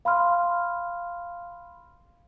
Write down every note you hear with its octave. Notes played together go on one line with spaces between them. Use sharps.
F5 B5 C6 F6